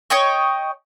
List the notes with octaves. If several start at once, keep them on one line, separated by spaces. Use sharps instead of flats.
C#5 D#5 G5 C#6